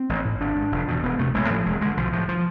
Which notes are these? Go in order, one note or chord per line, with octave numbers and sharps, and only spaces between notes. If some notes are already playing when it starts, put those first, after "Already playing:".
Already playing: C4
A1
A2
G#1 D4
G#2
F1
E2 B2
E1 B3
D2 C3 A3
A1 G#3
A2 F3
E1 G#3
D2 D3 G#3
B1 F3
A2 F3
F3